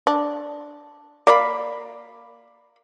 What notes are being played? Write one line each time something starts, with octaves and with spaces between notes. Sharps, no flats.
D4
A#3 D5 F5 B5